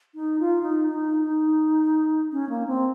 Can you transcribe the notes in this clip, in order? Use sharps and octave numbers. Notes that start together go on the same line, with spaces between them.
D#4
F4
D#4
D#4
D#4
C#4
A#3
C4